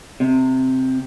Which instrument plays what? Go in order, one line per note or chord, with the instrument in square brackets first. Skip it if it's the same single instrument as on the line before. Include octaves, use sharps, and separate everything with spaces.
[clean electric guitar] C3